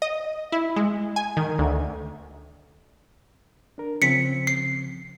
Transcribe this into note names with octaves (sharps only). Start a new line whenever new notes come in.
D#5
E4
G#3
G#5
D#3
D2
D4 A#4
C#3 F3 C4 B6 C#7
C7